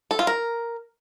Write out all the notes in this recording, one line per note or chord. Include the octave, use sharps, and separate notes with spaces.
A4
F4
A#4